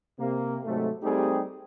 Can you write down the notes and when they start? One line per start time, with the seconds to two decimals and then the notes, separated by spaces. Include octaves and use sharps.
0.18 C3 A#3
0.64 G#2 C3 F#3 A3
1.02 G3 A3 C4 D#4 G4 G#4